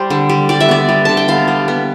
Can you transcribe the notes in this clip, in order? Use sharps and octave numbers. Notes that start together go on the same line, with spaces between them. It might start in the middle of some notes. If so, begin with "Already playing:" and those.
Already playing: G3 C5
D3
G3
G3 D5
E5
B3 D5
G3
D3 A5
G5
B3 F5
G3
B3